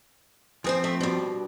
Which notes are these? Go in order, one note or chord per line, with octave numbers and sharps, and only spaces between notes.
F3 C4 G#4 B4 C5
A3
G2 B2